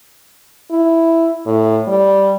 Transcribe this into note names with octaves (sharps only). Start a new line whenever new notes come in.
E4
A2
G3